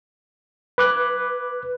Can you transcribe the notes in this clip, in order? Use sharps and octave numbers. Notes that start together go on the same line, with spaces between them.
B4 D6 F#6